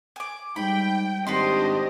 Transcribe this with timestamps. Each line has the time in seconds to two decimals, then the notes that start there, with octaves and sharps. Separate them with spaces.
0.16 G#5 D6
0.56 G#2 G3 G5 B5
1.27 G#1 D4 F#4 G4 B4 C5 D#5 C6